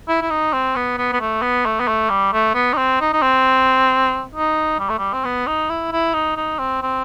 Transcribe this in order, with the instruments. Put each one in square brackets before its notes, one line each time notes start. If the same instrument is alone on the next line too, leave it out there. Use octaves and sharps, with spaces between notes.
[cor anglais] E4
E4
D#4
C4
B3
B3
B3
A3
B3
A3
B3
A3
G3
A3
B3
D#4
C4
D#4
D#4
C4
D#4
G3
A3
G3
C4
B3
D#4
E4
E4
D#4
D#4
C4
C4